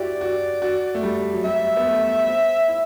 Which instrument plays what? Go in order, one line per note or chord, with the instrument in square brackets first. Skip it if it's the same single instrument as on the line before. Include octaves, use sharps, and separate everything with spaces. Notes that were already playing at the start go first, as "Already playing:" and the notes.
Already playing: [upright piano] E4 F#4 G4 [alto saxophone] D5
[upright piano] F#4
F#4
A3
G3
F#3
[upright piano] G3 [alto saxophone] E5
[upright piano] B3
A3
C4
E4